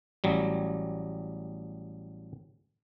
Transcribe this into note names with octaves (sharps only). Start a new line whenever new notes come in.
A1 F#3 G3